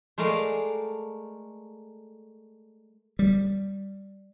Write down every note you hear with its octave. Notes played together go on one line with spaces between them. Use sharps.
G#3 A3 A#4 D5 F5
G3